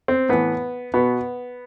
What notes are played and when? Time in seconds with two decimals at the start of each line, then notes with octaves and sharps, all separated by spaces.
0.08 C4
0.29 A2 E3 B3
0.94 B2 B3